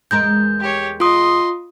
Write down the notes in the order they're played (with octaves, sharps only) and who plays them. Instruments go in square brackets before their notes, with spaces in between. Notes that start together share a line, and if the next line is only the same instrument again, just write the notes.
[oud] E2 G#3 A#4 [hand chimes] G6
[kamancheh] G4 C#5
[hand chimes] F4 D#6 [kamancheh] D#5 C6